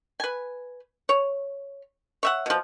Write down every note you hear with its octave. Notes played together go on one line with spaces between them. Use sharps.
B4 G#5
C#5
C#5 E5 F#5
B2 F3